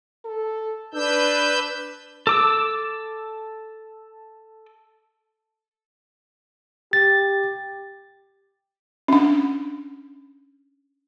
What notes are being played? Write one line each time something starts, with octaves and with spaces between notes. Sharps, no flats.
A4
D4 B4 E6 G6
A4 D6 E6
G4 A6
C#4 D4